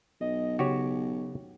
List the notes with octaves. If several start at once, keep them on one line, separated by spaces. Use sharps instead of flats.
B1 D#5
C#3 F#4 G4 C#5